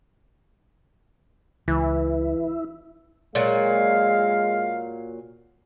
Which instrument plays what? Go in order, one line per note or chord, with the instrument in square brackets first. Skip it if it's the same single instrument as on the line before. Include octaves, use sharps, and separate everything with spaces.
[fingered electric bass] C#2 [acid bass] E3 [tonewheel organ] E4
[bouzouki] A#2 F#3 [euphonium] G#3 [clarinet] F5